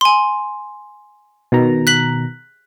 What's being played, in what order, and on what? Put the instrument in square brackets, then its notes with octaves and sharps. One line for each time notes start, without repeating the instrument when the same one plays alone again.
[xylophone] G#5 C6
[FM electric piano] B2 D#3 A#5
[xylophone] F#6 B6 F#7